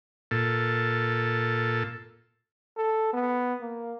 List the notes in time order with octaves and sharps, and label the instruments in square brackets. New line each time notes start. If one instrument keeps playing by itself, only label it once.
[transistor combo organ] A#2 A4
[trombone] A4
B3
A#3